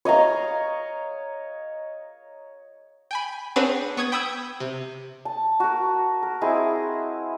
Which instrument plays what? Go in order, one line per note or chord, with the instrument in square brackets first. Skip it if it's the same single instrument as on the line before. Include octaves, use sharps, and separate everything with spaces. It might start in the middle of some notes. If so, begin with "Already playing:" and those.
[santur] C#5 D#5 F5 A#5
[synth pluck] G5 G#5 B5
C4 D4 G#4 B4 C#5 F#5
B3 C#6 D#6 G#6
G5 B5 D#6 E6 G6 G#6
C3
[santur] A5
F#4 A#4
A#4
C4 E4 G#4 D#5